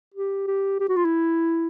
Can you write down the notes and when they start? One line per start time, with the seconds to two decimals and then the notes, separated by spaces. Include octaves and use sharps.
0.14 G4
0.47 G4
0.80 G4
0.89 F#4
0.96 F4
1.05 E4